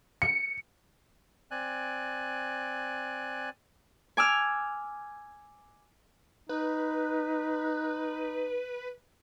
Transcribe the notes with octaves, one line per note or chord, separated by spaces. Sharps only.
C#7
C4 D5 G#5 F#6
G#5 D6 E6 F6
D#4 B4